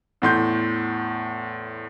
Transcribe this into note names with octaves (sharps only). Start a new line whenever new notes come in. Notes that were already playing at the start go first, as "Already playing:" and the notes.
E2 A2 C6 G6